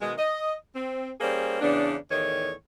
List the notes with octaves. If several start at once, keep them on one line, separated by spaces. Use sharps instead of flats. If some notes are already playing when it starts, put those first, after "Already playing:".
B2 D#3 G#3
D#5
C4
G3 A#3 C#4 G#4 C5
E2 C#3 B3 D4
E2 A2 D#3 C#5